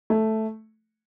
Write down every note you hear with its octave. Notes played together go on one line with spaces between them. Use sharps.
A3